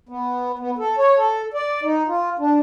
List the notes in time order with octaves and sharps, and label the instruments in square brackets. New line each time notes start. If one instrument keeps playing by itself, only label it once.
[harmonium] B3
B3
A4
C#5
A4
D5
D#4
F4
D4